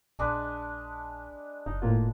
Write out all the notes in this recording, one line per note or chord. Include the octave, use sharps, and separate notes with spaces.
A#1 G#3 D4 B4
F#1 D#4
A2 A#3 F4